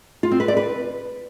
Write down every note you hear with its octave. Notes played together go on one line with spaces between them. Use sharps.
F4
C4
B4
D5
B4